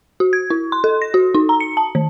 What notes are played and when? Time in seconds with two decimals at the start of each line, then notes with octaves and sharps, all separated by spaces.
0.20 F#4
0.33 G#6
0.50 E4
0.72 C6
0.84 A4
1.02 A#6
1.14 F#4
1.35 D#4
1.49 A#5
1.60 C#7
1.77 A5
1.95 D#3